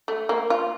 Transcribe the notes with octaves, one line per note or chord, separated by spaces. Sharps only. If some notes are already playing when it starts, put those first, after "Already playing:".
A3
A#3
F4